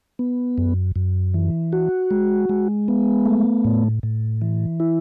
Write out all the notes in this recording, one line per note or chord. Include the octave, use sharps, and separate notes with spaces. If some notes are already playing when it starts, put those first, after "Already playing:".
B3
F#2
F#2
E3
F#4
G#3
G#3
B3
A3
A2
A2
E3
E4